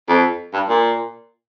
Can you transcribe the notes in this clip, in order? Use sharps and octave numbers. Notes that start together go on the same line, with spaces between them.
F2
G2
A#2